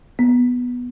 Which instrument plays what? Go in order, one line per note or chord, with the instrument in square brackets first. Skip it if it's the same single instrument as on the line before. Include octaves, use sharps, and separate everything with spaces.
[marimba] B3